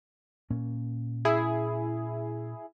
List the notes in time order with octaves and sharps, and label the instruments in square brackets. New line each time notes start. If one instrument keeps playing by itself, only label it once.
[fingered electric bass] A#2 A#3 C#4
[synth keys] E4 G#4